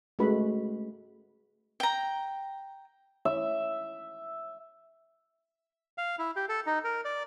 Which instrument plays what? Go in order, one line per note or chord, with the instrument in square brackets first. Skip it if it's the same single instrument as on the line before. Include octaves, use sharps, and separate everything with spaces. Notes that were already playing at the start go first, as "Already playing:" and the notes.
[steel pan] G#3 A3 C#4 F#4 B4 B5
[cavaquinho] G5 A#5
[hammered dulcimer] E5
[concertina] F5
E4
G4
A4
D#4
A#4
D5